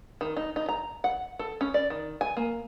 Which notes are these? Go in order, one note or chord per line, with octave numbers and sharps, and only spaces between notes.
D#3
D#4
D#4
A#5
F#5
A4
C#4
D5
D#3
G#5
A#3